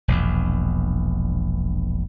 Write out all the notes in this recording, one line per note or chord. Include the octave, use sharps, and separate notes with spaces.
E1 A#1 E2